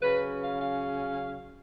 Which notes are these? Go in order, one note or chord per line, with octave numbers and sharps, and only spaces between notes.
C#3 F#3 C#4 B4
F5
F5